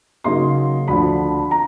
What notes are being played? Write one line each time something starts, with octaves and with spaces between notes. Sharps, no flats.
C#3 F#3 A#3 D#4 C6
D2 D3 F3 B5
A#5